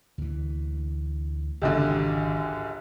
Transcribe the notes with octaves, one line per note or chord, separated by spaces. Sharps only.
D2 E3
G#1 C#2 F#2 D3 G4